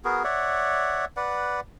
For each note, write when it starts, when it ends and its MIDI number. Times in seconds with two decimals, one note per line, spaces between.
0.05 0.23 59
0.05 0.23 66
0.05 0.23 68
0.05 0.23 70
0.24 1.05 73
0.24 1.05 74
0.24 1.05 76
0.24 1.05 78
1.16 1.60 71
1.16 1.60 74
1.16 1.60 78